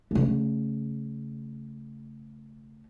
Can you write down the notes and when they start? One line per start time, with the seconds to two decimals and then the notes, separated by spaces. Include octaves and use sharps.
0.11 C#3 A3